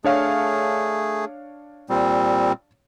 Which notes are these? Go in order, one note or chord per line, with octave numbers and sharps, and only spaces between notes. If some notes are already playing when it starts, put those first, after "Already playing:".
A3 D4 G#4 C#5 F5
A#2 G3 C4